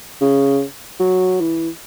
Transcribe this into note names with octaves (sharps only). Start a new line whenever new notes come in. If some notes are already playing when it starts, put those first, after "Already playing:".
C#3
F#3
E3